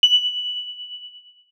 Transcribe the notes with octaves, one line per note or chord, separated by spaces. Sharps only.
F#7